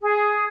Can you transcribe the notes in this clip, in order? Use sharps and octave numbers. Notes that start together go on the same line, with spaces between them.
G#4